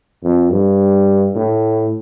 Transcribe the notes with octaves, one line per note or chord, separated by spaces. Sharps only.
F2
G2
A2